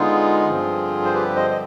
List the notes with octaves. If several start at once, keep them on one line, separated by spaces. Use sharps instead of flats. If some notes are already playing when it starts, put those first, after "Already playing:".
Already playing: D3 G#3 B3 D#4 F4 G#4
G2 D3 F3 C4
C5
G4 B4
C5 D#5
D#5